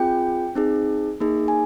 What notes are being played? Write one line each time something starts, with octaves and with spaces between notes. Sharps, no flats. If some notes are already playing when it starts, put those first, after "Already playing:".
Already playing: C4 F4 G#4 G5
C4 D#4 G#4
A#3 D#4 G#4
G#5